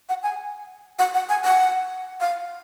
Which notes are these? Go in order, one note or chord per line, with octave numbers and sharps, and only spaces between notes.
F#5
G#5
F#5
F#5
G#5
F#5
F5